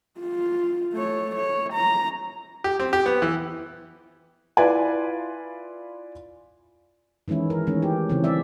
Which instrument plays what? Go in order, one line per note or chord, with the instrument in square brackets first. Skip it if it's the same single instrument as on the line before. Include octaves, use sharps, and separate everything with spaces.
[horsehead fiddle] F4
A3 C#5
C#5
A#5
[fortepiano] G4
C4
G4
B3
E3
[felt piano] E4 F4 B4 D5 G#5
[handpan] D#3 E3 G#3 C#4 E4
A#4
D#3 E3 G#3 A3 C#4
G4
C#3 E3 C4 C#4
G3 C4 D5 E5